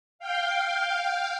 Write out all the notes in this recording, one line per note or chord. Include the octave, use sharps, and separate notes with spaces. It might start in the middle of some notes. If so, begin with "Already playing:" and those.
F5 G5